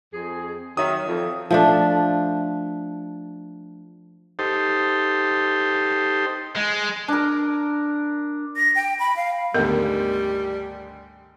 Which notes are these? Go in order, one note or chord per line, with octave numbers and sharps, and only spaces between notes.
F2 G#4
D#3 F#3 E5 D#6
F2
F3 A3 D4
D#4 G4 A4 C5
G#3
D4 A#4
A#6
G5
B5
F5
G#1 D2 G3 B3 A4 A#4